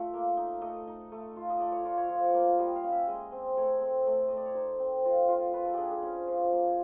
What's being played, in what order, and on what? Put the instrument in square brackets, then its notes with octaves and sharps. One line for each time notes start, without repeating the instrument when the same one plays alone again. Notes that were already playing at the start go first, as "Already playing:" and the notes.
Already playing: [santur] A3 F4 E5
A#3
D#4
A3 D#5
D#4
A3
F4
D#5
A3 D5
C#5
F4 D5
C#5
F3
A#3
G3 D#5
F5
C#4
E5
G#3 D#5
C4
A3 C#5
C4
A3
A3 D#5
D5
C#5
D#4 C5
C4
F4
F4
F4 B4
A4
D4 G4 G#4
G#4
C#4 C5
F3
A#3